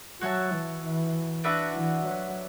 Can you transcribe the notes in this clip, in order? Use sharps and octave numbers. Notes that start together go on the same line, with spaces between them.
F#3 F#4 C#5 E5 A5
E3
E3
D4 F#4 B4 E5
E3
F#3